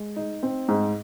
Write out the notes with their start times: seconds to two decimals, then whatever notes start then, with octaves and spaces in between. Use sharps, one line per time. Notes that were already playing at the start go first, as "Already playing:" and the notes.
Already playing: G#3
0.16 D#4
0.43 C4
0.68 G#2